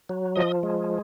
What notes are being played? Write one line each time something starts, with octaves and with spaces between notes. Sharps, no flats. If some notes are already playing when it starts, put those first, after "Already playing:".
F#3
F3 D#5
G#3